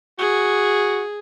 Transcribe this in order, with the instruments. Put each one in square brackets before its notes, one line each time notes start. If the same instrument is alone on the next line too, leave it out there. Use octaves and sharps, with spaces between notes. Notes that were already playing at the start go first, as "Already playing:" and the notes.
[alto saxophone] F#4 [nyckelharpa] G#4